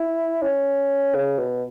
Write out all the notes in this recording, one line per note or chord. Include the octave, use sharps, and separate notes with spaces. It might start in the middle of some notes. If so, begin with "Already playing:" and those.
Already playing: E4
C#4
C#3
B2